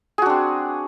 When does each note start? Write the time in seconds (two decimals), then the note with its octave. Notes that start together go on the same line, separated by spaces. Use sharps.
0.18 G#4
0.22 F#4
0.26 D4
0.30 C4